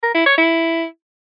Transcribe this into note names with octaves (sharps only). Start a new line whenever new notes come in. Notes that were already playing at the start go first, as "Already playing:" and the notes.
A#4
E4
C#5
E4